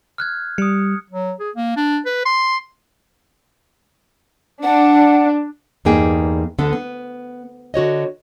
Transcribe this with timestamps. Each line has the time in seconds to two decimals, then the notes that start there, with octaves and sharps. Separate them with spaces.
0.18 F6 F#6 G#6
0.58 G3 D#6 C#7
1.10 F#3
1.40 G#4
1.56 A#3
1.77 D4
2.06 B4
2.26 C6
4.63 D4 F#5
5.85 E2 G2 A#3 D#4 G#4 G5
6.58 D2 D3 B3 A4
6.73 B3
7.74 D3 F#4 C#5 D#5